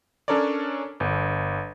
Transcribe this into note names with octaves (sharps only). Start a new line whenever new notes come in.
C#4 D4 A4 A#4 C#5 D5
G1